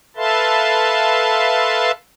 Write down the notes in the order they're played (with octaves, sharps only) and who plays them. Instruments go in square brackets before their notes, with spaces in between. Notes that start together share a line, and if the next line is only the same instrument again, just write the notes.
[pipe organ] A4 B4 E5 F5 A5 C6